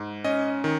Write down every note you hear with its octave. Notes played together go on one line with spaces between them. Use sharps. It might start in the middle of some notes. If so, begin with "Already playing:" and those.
Already playing: G#2
C#4 D#5
D#3